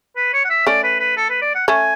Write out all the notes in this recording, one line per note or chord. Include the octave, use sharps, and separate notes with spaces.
B4
C#5
F#5
E5
A3 C#4 D5
B4
B4
A4
B4
D5
F#5
A3 C#4 G#5